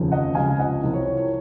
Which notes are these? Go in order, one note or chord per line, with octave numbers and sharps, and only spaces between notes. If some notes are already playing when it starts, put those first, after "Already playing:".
Already playing: F1 D#2 C#3 F3
D#5 F#5
C#2 C3 F3 F5 G#5
D#5 F#5
C2 C3 F3
C#5
C#5
C#5